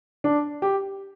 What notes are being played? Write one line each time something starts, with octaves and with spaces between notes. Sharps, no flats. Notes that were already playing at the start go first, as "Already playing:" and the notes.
D4
G4